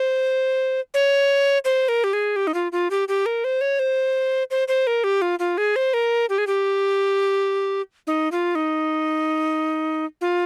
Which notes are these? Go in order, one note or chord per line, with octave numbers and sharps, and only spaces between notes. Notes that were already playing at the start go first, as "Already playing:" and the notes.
Already playing: C5
C#5
C5
A#4
G4
G#4
G4
D#4
F4
F4
G4
G4
A#4
C5
C#5
C5
C5
C5
A#4
G4
F4
F4
G#4
C5
A#4
G4
G#4
G4
D#4
F4
D#4
F4